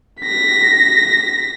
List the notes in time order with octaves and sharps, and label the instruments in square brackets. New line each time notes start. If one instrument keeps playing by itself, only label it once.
[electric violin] A#6 B6